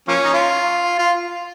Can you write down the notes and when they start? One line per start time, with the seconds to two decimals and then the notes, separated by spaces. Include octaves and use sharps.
0.08 F3 A#3 C#4
0.24 D#4
0.33 F4
0.98 F4